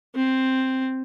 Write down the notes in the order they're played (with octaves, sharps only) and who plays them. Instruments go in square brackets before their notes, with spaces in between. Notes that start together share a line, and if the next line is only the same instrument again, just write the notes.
[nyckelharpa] C4